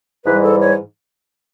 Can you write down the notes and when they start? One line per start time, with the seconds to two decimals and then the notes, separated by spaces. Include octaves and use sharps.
0.25 G#2 E3 G3 B4
0.43 A4
0.61 C#5